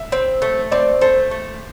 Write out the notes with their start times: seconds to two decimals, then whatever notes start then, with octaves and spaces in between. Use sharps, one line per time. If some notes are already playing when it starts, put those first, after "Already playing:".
Already playing: E5
0.12 C4
0.42 A3
0.71 C4 D5
1.01 A3 C5
1.31 A3